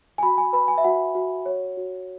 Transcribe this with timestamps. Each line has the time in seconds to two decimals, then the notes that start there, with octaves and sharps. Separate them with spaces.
0.18 G#5
0.23 F#4 B5
0.38 G#5
0.53 B4 B5
0.68 G#5
0.78 E5
0.84 F#4 F#5
1.15 F#4
1.46 C#5
1.77 F#4